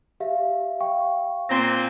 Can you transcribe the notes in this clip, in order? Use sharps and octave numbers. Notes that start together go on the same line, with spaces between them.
G4 E5 F5
F5 G5 C#6
A#2 C4 A#6 C7